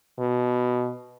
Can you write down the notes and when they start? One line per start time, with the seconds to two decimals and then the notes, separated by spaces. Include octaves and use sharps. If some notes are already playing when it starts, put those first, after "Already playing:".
0.19 B2